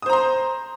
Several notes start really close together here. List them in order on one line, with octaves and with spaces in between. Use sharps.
D#6 C5 A#5 C6